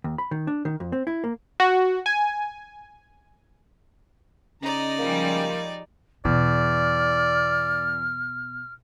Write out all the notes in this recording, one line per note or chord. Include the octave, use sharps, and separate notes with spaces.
D#2
B5
D#3
D4
D#3
F2
C4
E4
A#3
F#4
G#5
C#3 D#4 D5 D#5 A#5
F3 G3 G#3 A#3
E2 B2 D5 F6